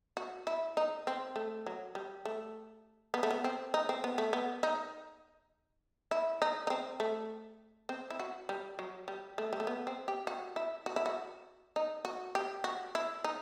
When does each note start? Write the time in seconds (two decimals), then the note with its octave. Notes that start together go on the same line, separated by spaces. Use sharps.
0.17 F#4
0.47 E4
0.77 D#4
1.07 C4
1.36 A3
1.66 F#3
1.95 G3
2.25 A3
3.14 B3
3.23 A3
3.31 B3
3.44 C4
3.74 D#4
3.89 C4
4.04 B3
4.18 A3
4.33 B3
4.63 D#4
6.11 E4
6.42 D#4
6.67 D#4
6.70 C4
7.00 A3
7.89 C4
8.10 E4
8.19 F#4
8.49 G3
8.79 F#3
9.08 G3
9.38 A3
9.53 G3
9.60 A3
9.67 B3
9.87 C4
10.08 G4
10.27 F#4
10.56 E4
10.86 F#4
10.96 E4
11.06 F#4
11.76 D#4
12.05 F#4
12.35 G4
12.64 F#4
12.95 E4
13.24 D#4